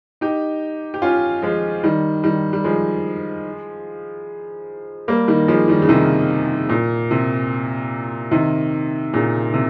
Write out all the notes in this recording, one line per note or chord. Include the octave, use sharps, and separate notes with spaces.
D#4 G4
G4
C#4 F4
F3 G#3
D#3 G3
D#3 G3
G3
F3 G#3
G3 A#3
D#3 G3
F3 G#3
D#3 G3
C#3
C3 D#3
A#2
C3
C3 D#3
A#2 C#3
C3